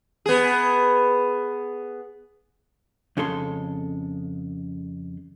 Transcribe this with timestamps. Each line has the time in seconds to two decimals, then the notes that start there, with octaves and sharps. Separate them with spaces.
0.26 B3 G#4
3.17 F2 C#3 G#3 A4 C6